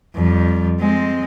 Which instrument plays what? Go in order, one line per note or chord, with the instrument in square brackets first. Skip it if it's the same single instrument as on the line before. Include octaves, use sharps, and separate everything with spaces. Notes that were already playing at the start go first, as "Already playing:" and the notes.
[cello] F2 G3
G#3 C4